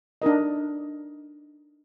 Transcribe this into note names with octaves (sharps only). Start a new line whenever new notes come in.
D4 D#4 A#4 D#5